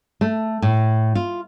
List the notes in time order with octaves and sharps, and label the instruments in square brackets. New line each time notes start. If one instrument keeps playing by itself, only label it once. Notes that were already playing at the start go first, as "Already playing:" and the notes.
[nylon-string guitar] A3
A2
F4